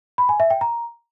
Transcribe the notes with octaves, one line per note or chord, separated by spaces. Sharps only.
B5
G#5
E5
G5
A#5